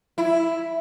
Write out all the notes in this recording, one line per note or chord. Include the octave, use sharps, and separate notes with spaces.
E4